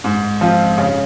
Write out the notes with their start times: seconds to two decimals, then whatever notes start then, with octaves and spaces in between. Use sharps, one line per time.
0.04 G#2
0.41 F3 C4 F4
0.78 C#3